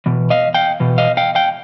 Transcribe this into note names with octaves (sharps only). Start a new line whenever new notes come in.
E2 B2
D#5 F5
F5 G5
E2 B2
D#5 F5
F5 G5
F5 G5